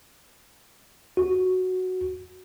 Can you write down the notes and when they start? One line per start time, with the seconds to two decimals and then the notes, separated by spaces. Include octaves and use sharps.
1.17 F#4